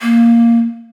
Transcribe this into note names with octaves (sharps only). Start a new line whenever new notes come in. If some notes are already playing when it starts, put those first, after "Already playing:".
A#3